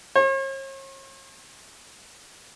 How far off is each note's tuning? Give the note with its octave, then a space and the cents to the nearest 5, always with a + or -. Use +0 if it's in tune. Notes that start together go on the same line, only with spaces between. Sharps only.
C#5 -45